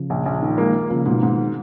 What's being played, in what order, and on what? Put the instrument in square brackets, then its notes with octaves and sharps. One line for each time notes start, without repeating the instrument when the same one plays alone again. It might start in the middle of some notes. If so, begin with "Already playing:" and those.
Already playing: [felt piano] C#3 F3
[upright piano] A#1
A#1
D#3
[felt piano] F3 G#3 [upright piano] A#3
[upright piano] A#3
[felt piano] C#3 F3 [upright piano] A#3
[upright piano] G#2 [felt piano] B2 D#3
[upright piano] G#2